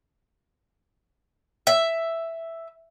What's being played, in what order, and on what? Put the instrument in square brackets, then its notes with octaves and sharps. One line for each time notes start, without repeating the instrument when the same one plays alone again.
[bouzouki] E5